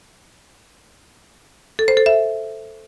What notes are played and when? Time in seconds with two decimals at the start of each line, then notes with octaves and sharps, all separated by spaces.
1.79 A4
1.88 C5
1.97 A4
2.06 E5